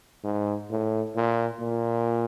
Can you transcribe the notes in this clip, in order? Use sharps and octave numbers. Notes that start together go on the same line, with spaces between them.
G#2
A2
A#2
A#2